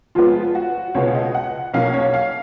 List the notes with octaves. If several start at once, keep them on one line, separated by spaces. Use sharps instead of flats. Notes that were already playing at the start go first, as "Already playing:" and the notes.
F2 F3 G#3 B3 F4
F#4
C#2 B2 G#3 B3 C#5
D#5
F#5
B1 B2 A#3 C#4 F5
C#5
F5